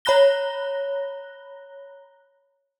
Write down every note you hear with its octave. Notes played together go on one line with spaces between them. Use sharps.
C#5 A#5 B5 F#6 A#6 G7